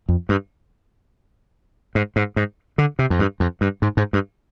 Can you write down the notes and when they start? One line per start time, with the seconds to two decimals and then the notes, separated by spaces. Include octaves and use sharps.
0.09 F2
0.29 G2
1.95 G#2
2.16 G#2
2.36 G#2
2.78 D3
2.99 C3
3.10 F2
3.19 G2
3.40 F2
3.61 G2
3.82 G#2
3.97 G#2
4.13 G2